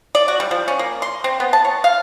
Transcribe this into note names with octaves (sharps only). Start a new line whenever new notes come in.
D5
F#4
G3
F3
C#4
A#3
C6
C4
B3
A5
C#5
F5